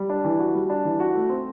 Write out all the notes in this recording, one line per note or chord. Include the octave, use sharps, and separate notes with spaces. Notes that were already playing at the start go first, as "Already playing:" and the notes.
Already playing: G3
D4
E3
F#4
G3
D4
E3
F#4
A3
C4